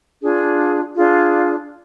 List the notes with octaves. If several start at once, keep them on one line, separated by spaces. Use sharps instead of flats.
D4 F4 G#4
D4 F4 G#4